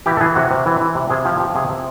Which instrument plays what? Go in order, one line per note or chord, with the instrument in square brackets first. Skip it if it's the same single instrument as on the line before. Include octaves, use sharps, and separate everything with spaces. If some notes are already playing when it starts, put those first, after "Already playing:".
[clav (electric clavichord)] E3 G4
A4
E3 G#4
C3 F#4
C3
E3
E3
C3
C3 G#4
F3 G4
F3 G4
C3 G#4
C3